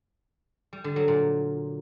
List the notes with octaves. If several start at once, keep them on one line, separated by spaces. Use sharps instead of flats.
G3
D3
F#3
A#2